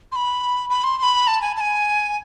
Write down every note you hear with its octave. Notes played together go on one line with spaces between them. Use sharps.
C6
B5
B5
C6
C6
B5
A5
G#5
A5
G#5